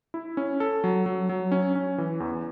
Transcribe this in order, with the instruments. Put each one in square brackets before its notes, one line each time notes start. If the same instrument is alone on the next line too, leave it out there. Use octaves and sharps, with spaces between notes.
[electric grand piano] E4
C#4
A4
F#3
F#3
F#3
C#4
C#4
E3
E2